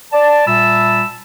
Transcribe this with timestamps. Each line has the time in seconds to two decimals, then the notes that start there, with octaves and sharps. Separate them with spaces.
0.12 D5 A5
0.47 A#2 G3 E5 A5 B5 E6